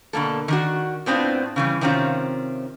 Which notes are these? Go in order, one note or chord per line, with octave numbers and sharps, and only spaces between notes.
B2 D3 A#3 A4
D#3 D4 F#4
A2 B3 C4 D4 F4
C#3 E3 G3
C3 D#3 C4 C#4 F4